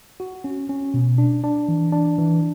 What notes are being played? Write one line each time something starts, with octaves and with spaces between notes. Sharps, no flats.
F#4
C#4
C#4
B2
D4
D4
E3
D4
E3